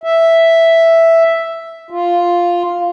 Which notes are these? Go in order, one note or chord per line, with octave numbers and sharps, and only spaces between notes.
E5
F4